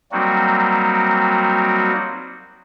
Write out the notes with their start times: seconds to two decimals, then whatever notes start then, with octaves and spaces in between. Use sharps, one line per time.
0.12 F#3 G3 A#3 C4 D#4 F#4